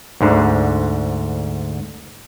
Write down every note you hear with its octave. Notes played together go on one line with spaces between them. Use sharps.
D2 G#2 D3